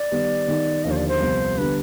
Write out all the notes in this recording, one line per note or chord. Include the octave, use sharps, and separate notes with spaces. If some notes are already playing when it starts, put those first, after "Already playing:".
Already playing: D5
D#3 G3 B3
D#3 B3 D#4 G4
D#2 D3 F3 D#5
C5
D5
C5
C2 C3 F3 B3
D3 G3 B3 B4